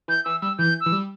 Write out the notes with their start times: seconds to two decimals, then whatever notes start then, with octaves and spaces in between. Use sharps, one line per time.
0.08 E3 G6
0.25 E3 E6
0.41 G3 E6
0.58 E3 G6
0.81 E6
0.86 E3
0.92 G3